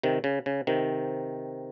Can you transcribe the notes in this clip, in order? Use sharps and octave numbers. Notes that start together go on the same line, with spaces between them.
C3 D#3
C#3
C#3
C3 D#3